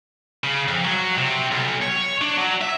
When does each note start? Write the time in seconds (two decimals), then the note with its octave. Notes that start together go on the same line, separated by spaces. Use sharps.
0.44 C#3
0.68 F2
0.85 F#3
1.18 C3
1.52 B1
1.83 C#5
2.21 D4
2.37 F#3
2.61 E5